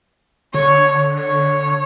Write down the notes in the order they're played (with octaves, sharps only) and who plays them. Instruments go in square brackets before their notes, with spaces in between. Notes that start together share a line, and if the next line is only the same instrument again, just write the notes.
[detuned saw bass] D3 [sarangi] C#5
[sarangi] C#5